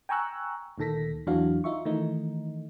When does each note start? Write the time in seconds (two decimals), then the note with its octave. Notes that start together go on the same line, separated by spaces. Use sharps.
0.09 G5 G#5 A#5 C#6 E6 F#6
0.78 D2 A#2 D#3 A4 A#6 B6
1.27 E2 E3 F#3 D4 F#4 F5
1.64 D#4 F4 E5 C#6
1.85 D#3 E3 A3 D#4